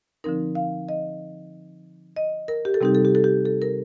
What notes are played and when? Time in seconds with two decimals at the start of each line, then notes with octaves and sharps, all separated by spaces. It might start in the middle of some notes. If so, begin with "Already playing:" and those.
0.24 D3 F3 C4 D#4 A#4
0.55 F5
0.89 D#5
2.16 D#5
2.48 A#4
2.65 G4
2.74 A4
2.81 C3 G3 C4 D#4 G4
2.95 A4
3.05 G4
3.15 A4
3.24 G4
3.45 A4
3.62 A#4